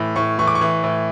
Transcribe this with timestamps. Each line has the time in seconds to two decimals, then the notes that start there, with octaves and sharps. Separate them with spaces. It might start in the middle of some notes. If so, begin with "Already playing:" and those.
Already playing: A2 E3
0.16 A2 C#6
0.39 E3 C#6
0.47 D6
0.55 C#6
0.61 E3
0.84 A2